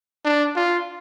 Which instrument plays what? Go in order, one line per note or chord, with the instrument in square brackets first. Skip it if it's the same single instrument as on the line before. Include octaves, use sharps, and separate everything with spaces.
[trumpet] D4
F4